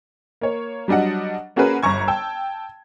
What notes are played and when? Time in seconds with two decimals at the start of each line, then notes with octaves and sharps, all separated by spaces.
0.41 A#3 C#5
0.88 F#3 G3 D4 D#5 F#5
1.56 A#3 C#4 F#4 G#4 A#4 B4
1.83 G1 A#5 C#6 G#6
2.08 G5 A5 E6